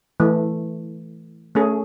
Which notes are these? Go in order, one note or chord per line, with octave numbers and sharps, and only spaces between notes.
E3 A3
A3 C#4 G#4